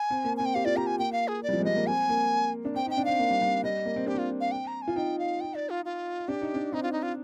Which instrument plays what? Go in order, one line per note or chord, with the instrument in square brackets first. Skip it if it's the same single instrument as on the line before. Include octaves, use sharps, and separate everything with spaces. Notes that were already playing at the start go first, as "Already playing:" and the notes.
Already playing: [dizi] G#5
[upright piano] C4
A#3
[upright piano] C4 [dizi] G#5
[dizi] G5
[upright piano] G4 [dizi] F5
[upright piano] F4 [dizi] D5
[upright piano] G4 [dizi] A#5
[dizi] G#5
[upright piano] A#3 [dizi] G5
[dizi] F5
G#4
D5
[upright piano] G3
F3
G#3
[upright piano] G3 [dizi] D#5
[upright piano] A#3
[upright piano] C4 [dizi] G#5
[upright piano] A#3
D4
[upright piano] C4 [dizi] G5
[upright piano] D#4 [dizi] G5
[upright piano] D4
[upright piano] C4 [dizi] F5
[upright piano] A#3
G3
G3
[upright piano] G3 [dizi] D#5
[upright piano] A#3
C4
[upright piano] D4 [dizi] G4
[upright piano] C4 [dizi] F4
[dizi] F5
G5
A#5
G#5
[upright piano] F4
[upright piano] D#4 [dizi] G5
[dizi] F5
G5
D5
F4
F4
[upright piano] D4 [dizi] G4
[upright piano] D#4
D4
[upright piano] C4 [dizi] D#4
[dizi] F4
D#4
F4